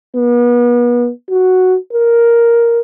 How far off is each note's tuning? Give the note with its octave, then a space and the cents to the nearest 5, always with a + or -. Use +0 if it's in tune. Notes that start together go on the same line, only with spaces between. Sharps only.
B3 -35
F#4 +0
A#4 +5